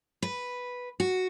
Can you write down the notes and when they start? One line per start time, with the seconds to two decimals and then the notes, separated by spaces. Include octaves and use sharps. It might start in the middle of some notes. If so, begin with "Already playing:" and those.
0.22 B4
1.00 F#4